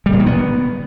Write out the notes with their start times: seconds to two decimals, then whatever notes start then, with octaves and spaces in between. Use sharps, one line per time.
0.06 G3
0.13 A#2
0.19 D#3
0.26 B3